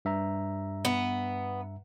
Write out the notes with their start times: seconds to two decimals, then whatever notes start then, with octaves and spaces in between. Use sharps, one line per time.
0.05 G2 E5 A#5
0.85 B3